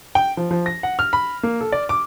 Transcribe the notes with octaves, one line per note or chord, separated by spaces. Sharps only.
G5
F3
F3
A#6
F#5
F6
B5
A#3
A4
D5
D6